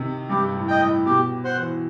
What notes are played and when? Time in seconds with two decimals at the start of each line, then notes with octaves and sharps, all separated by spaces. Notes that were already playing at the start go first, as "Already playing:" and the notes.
Already playing: C3 D#3
0.30 G2 G4
0.55 A2
0.68 D#5 G5
0.80 A2
1.05 B2 G4
1.44 C5 F#5
1.56 E3